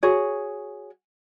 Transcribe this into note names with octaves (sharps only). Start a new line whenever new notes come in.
F#4 G#4 C#5